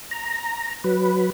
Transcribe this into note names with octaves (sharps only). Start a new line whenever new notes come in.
A#5
F#3 B4